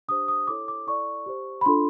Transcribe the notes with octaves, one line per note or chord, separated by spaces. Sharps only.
D4 G4 C5 D#6
D#6
E4 A4 C#5 D6
D6
E4 A4 D5 C#6
G4 C5
B5
D4 F4 A4 C6